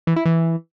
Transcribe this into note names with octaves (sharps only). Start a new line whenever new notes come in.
E3
E4
E3